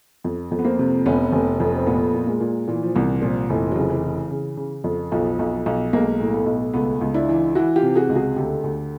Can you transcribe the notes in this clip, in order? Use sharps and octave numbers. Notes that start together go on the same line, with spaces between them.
F2
F2
B3
A#3 C4
C3
F1 B3 C#4
F1
F2
C4
A#2 A3 B3
A#2
G#3 A#3
A#2
A#2 E3
F3
C2 E3
A#2 F3
F1 E3
F#3
C#3
F3
E3
E3
C#3
C#3
F2
B1 F3
B1
B1
B1 G#3 A#3
A2
A3 B3
B1
C#2 A3 B3
C#2
D4 E4
E3
E3 E4 F#4
F4 G4
C3
F#4 G#4
C#2
F#4 G#4
D2 G4 A4
D2